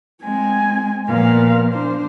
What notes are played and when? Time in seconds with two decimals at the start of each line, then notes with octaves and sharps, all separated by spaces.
0.24 G#3 C4 G#5
1.07 A#2 F3 B3 F5
1.74 D4 C5